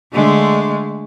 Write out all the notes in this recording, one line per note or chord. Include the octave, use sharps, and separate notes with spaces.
D3 G#3 A3